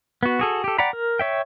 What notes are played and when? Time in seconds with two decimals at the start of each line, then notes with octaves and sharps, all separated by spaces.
0.23 B3 F#4
0.39 F#4 G#4 A4
0.64 G4 A4
0.78 D5 F#5 G5 A#5 B5
0.93 A#4
1.19 C#5 E5 G5